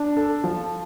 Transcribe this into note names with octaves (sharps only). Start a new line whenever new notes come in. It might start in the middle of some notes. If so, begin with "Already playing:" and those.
Already playing: D4
A4
F3